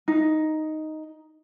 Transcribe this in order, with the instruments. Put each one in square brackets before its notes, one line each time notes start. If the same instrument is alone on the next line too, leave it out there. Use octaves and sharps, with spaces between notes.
[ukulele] D#4